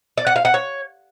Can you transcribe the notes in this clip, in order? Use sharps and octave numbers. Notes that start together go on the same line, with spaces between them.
D5
F#5
F5
F#5
C#5